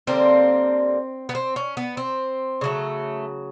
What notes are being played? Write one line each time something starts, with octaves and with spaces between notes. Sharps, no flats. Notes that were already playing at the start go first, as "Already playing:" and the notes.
D3 G3 A#3 C4
B3
C4
C#4
B3
C4
C#3 F#3 A3